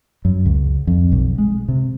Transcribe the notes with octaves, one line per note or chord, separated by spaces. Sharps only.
F#2
C#2
F2
B1
G#3
C3